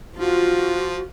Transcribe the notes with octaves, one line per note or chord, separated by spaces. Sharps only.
F3 F4 F#4